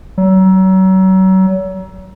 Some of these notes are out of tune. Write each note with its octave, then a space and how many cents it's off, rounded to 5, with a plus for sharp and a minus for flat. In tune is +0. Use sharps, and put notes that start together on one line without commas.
F#3 +35